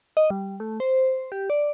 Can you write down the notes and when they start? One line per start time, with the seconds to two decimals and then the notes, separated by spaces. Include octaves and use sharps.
0.17 D#5
0.30 G3
0.60 A3
0.80 C5
1.32 G4
1.50 D5